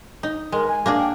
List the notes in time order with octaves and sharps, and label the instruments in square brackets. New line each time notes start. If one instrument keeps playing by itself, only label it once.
[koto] D#4
[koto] G#3 [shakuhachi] A#4
[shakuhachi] G#5
[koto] A#3 D4 G#4
[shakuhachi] G5